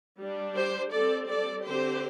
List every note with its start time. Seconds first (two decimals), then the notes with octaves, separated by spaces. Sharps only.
0.19 G3 D4
0.55 G4 C5
0.92 G3 C4 A4 D5
1.29 A4 D5
1.66 D3 C4 G4 C5